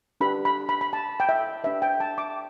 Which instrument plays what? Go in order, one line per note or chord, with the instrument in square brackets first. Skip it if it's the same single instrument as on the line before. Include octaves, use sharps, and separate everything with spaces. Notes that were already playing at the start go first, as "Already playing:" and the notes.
[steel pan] D4 G4 B4 B5
B5
B5
B5
A5
G5
E5
D4 G4 B4 E5
G5
A5
D6